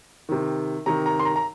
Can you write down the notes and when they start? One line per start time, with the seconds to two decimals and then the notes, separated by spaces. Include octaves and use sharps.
0.29 C3 D#3
0.86 C3 D#3 A#5
1.06 A#5
1.19 C6
1.25 A#5
1.36 A#5